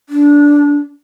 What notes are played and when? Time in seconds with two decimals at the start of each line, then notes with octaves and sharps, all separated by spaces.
0.09 D4